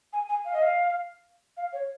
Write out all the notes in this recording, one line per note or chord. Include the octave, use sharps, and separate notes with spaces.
G#5
G#5
F5
D#5
F5
F5
C#5